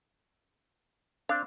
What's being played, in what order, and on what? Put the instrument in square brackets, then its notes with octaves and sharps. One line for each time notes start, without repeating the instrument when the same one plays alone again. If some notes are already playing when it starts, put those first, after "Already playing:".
[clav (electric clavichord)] C4 D4 [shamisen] F5